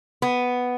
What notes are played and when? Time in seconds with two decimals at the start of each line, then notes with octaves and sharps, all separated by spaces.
0.22 B3